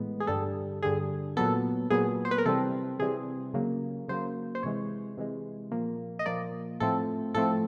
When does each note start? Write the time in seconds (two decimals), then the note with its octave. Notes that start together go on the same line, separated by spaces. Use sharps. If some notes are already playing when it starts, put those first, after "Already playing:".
Already playing: A2 E3 G#3 B3
0.20 G#4
0.27 G2 D3 G3 A4
0.83 G2 D3 G3 G#4
1.37 A#2 F#3 B3 A4
1.90 A#2 F#3 B3 G#4
2.25 C5
2.31 B4
2.38 A#4
2.46 C3 E3 G3 C4 A4
2.99 C3 E3 G3 C4 G#4
3.54 C#3 F#3 A#3
4.08 C#3 F#3 A#3 C5
4.55 C5
4.63 C3 E3 G#3 C#5
5.17 C3 E3 G#3
5.72 A#2 F3 A#3
6.19 D#5
6.26 A#2 F3 A#3 D5
6.80 A2 F3 A3 C4 A4
7.34 A2 F3 A3 C4 A4